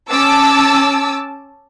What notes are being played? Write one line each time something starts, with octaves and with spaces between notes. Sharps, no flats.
C#4 A5 D6 E6